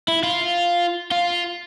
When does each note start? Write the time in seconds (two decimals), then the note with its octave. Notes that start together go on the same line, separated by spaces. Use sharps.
0.08 E4
0.23 F4
1.12 F4